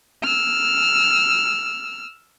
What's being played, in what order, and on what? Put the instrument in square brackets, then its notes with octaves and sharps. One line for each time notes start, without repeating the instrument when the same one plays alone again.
[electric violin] E6 F6